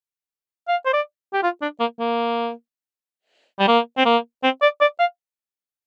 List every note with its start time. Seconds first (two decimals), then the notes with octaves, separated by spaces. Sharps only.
0.68 F5
0.86 C5
0.93 D5
1.33 G4
1.43 F4
1.62 D4
1.80 A#3
2.00 A#3
3.59 G3
3.68 A#3
3.97 C4
4.06 A#3
4.43 C4
4.62 D5
4.81 D5
4.99 F5